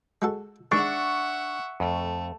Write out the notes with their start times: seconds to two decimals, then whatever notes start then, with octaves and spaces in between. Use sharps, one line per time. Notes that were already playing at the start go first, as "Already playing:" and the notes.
0.22 G#3 F#4 A4
0.72 D#3 G#3 D4 E5 F#5 C#6
1.80 F2 A3